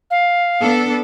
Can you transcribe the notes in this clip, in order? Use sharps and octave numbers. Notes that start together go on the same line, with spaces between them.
F5
B3 D4 A4